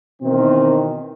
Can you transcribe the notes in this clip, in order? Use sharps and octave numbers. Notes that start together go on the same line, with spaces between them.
B2 D#3 E3 C4